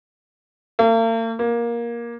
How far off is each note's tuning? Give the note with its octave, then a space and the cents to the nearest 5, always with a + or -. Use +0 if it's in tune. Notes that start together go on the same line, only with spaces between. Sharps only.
A#3 -45
A#3 +15